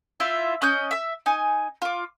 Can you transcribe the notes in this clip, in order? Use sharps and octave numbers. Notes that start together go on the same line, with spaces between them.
E4 F4 C5 E5
C#4 D#5 F#6 G6
E5 E6
D#4 G#5
F4 D6